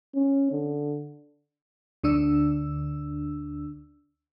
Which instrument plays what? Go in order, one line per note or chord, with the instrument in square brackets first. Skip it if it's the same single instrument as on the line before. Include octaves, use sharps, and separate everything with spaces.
[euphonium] C#4
D3
[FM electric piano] D2 D3 D4 E6